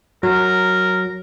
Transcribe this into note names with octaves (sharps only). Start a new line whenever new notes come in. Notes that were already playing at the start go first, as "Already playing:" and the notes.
F#3 A#4